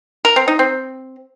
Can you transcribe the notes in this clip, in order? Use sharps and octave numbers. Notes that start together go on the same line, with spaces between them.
A#4
C4
D#4
C4